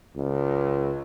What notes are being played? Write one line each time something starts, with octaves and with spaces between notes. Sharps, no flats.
C#2